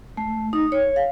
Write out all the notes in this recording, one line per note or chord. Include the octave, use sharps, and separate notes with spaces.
A3
D#4
C#5
F5